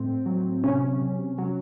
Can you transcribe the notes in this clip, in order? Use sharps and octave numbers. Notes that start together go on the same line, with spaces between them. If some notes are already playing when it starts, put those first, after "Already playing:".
Already playing: A2 C4
F#3
C3 C#4
C3
F#3